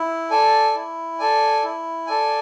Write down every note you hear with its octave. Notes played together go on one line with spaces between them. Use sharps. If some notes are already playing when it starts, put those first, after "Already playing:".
Already playing: E4
A4 D5 G#5
E4
A4 D5 G#5
E4
A4 D5 G#5